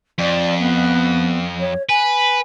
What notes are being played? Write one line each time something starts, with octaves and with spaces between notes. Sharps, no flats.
F2 D5
B3
C#5
B4 G#5